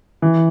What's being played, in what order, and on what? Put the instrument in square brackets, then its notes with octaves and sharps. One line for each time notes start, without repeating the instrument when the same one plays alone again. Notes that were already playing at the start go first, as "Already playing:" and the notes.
[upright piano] E3